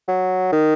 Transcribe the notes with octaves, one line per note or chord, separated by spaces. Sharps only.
F#3
D#3